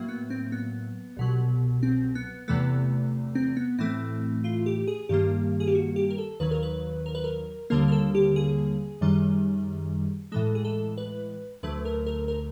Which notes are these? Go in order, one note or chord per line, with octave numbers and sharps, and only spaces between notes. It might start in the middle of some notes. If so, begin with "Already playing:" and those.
Already playing: A2 F#3 A#3
B3
C4
B3
C2 B2 F#3
C4
B3
E2 C3 E3 A3 B3
C4
B3
A2 E3 A3 C4
F4
G4
G#4
G2 D#3 G3 A#3 G4
G#4
G4
F#4
G4
A#4
A4
D#2 D#3 F#3 B4
A#4
B4
A#4
B4
A#4
D#2 D3 G3 A#3 A#4
A#4
A4
G4
G#4
F#2 D#3 G3
A2 E3 G#3 A4
G#4
A4
B4
D2 D3 F#3 A3 B4
A#4
A#4
A#4